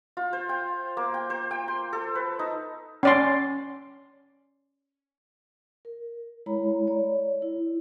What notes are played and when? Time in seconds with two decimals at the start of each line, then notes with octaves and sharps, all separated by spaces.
0.17 F4
0.33 C5
0.49 G5
0.97 A#3
1.14 G5
1.30 C5
1.51 G5
1.68 C6
1.93 A4
2.15 B4
2.39 D#4
3.03 C#4 D5 C6
5.85 A#4
6.46 G#3 E4 C#5 A#5 B5
6.87 C#5 D5
7.42 E4